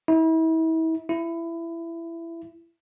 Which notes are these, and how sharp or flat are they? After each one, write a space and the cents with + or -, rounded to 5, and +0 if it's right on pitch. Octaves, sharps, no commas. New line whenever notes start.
E4 -35
E4 +20